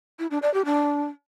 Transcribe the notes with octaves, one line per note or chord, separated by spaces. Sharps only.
E4
D4
D5
G4
D4